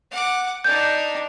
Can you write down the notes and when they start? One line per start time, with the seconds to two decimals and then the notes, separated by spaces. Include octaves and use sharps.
0.11 F#5 D6
0.64 D4 D#4 G6